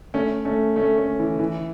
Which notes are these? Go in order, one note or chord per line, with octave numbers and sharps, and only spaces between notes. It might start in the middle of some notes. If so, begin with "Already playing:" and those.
A3 C#4
A3 C#4
A3 C#4
A3 C#4
E3
E3